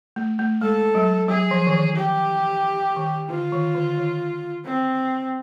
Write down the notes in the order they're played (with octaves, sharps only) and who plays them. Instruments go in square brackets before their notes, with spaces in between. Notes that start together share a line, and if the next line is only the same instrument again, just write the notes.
[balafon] A3
A3
[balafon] G#3 [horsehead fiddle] A4
[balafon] F#3
[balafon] F#3 [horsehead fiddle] G#4
[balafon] F3
D#3
E3
[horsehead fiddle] G4
[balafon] D#3
[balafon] D3 [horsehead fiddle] F4
[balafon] D#3
D3
D#3
[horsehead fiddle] C4